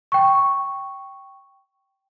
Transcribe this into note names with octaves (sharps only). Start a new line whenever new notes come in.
G5 C#6